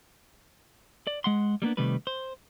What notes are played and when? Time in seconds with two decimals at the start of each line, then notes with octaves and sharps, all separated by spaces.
1.07 D5
1.24 G#3 F#5 C6
1.62 G3 A#3 B3 D4
1.77 C3 D#3 G3 A3 B4
2.07 C5